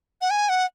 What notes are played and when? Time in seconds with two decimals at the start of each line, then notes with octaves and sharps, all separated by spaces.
0.21 F#5
0.30 G#5
0.49 F#5